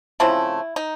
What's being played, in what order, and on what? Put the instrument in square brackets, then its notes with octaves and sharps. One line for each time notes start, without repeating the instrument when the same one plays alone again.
[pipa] C#3 F3 A3 C4 E4
D#4